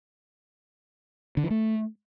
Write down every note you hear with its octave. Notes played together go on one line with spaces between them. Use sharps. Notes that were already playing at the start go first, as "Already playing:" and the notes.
D3
E3
A3